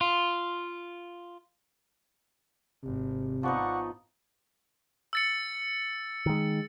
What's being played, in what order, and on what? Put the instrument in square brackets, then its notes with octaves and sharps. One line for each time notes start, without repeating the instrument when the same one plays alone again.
[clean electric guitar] F4
[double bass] G#1 [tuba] C3
[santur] F3 B3 D#4 [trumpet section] D5 F#5 C#6
[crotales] E6 A6 C#7
[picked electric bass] D#3 G#3